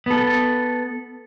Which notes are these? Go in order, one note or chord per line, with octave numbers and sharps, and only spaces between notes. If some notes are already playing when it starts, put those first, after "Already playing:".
B3 A4